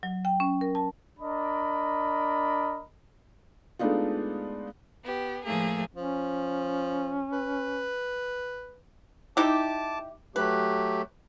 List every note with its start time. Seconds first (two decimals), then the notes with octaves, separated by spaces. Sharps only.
0.03 F#3
0.25 G5
0.40 C#4
0.61 A#4
0.75 A5
1.19 D4 A#4 D#5 B5
3.79 G#3 A3 B3 D4 D#4 F4
5.03 B3 G4
5.44 A2 F3 A3 A#3 G#4
5.95 F3 C#4
7.33 B4
9.37 D#4 E4 G4 A5 D6
10.36 F#3 A3 G4 B4